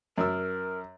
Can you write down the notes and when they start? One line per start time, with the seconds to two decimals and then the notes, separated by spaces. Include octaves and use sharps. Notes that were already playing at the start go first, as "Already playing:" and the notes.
0.18 F#2 A#4 E6